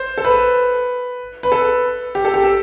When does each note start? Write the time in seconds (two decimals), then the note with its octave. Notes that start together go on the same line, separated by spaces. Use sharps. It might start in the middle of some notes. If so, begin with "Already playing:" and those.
Already playing: C5
0.18 A4
0.25 B4
1.43 B4
1.52 A4
2.15 G4
2.25 A4
2.34 G4
2.44 A4